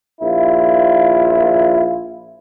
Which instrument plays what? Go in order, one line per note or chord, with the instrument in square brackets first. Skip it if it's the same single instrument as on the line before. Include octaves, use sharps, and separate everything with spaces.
[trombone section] A#1 E4 F4